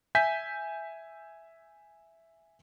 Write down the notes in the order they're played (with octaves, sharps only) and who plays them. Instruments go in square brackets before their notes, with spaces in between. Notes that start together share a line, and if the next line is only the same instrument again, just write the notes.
[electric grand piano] E5 G#5 G6 B6